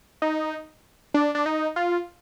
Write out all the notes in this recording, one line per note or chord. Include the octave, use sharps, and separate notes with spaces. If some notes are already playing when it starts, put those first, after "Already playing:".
D#4
D4
D4
D#4
F4